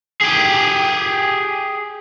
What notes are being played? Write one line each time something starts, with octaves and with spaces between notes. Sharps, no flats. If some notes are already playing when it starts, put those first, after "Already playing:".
G4 G#4